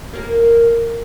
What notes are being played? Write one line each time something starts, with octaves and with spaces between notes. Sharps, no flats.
A#3 A#4